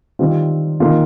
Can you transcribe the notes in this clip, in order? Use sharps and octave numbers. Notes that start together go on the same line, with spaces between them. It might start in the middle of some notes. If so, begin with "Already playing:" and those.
D#3 G3 C4 F4
D#3 A#3 F4